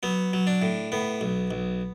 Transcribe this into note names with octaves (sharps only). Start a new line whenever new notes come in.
F#3 B3
F#3
D4
A2
A2 B3
B1
B1